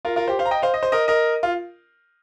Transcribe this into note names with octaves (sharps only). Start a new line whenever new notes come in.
F4 A#4
F4 A#4
G4 C5
C5 F5
A#5
D#5 G5
C5 F5
D#5
C5
A#4 D#5
A#4 D#5
F4